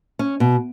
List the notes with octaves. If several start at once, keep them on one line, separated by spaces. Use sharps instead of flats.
C#4
B2